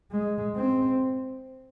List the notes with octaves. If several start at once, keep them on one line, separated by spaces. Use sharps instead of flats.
G#3
C4